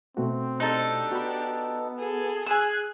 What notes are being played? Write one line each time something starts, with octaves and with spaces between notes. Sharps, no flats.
B2 A3 C4 F#4
D4 D#4 G4 A4
B3 F#4 B5
G#4 A4
G#4 G#5 E6 F#6